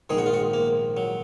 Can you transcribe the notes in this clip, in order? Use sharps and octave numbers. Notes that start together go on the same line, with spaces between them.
A#1 G#2 D#3 G#4
F#4
F4
F#4
A#3
F#3